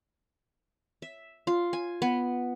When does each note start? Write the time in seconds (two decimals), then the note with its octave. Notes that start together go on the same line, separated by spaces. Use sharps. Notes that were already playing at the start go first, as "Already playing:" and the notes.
1.02 E5
1.47 F4
1.73 G#5
2.02 B3